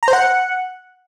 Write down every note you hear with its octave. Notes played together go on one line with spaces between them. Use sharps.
A#5
C5
F#5